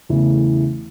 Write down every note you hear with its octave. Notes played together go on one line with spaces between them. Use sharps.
E2 C#3 E3 A3